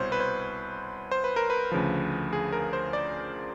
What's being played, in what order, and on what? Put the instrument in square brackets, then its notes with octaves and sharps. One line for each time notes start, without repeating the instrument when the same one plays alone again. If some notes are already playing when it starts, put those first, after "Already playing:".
Already playing: [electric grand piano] C2 B2 C5 C#5
B4
C5
C5
B4
A#4
B4
D2 C#3 F3
G#4
A#4
C5
D5